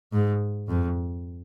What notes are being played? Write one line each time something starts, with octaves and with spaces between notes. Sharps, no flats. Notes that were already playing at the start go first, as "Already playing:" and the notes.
G#2
F2